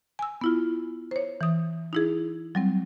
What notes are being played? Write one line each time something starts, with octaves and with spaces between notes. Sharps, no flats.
G#5 E6
B3 E4 F4
C5 C#5
E3 D#6
D#4 E4 G#4
F#3 G3 C4